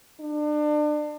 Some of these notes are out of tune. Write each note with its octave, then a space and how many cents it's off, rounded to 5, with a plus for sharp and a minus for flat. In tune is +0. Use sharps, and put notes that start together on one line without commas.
D4 +35